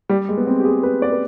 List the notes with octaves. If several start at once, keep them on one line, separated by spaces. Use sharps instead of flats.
G3
G#3
B3
C4
G4
G#4
B4
D5
B4